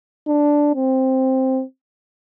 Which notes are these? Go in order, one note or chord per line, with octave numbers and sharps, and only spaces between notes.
D4
C4